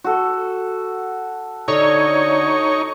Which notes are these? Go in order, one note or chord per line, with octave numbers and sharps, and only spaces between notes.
F#4 A4
D3 D#4 C#5 C#6